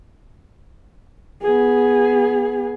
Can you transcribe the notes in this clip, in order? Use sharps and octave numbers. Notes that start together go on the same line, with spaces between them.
B3 G#4